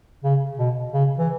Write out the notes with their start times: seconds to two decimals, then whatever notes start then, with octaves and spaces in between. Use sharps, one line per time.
0.24 C#3
0.59 B2
0.94 C#3
1.18 E3